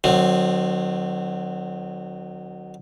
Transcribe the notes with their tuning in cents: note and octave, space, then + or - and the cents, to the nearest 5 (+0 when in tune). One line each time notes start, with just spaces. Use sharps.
D#3 -40 F#3 +0 C4 +0